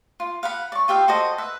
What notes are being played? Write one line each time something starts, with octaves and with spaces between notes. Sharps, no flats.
F4
F5 F#5 B5
D5 C#6
F4 G4 E5 F5
F#4 A4 C5 D#5
B4 E5